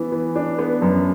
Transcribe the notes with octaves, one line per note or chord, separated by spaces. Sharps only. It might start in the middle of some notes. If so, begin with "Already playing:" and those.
Already playing: E3 B3
E3
D4
B3
F#2